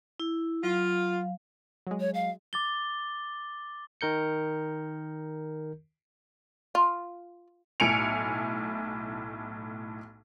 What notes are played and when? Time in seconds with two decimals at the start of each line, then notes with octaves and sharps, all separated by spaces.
0.20 E4
0.63 F#3 F4 F5
1.87 F#3 G#3
2.00 C#5
2.14 F5
2.53 D6 A6 G7
4.01 D#3 A#4 G6 C#7
6.75 F4
7.80 B1 A2 G#5 C#7 D7 F7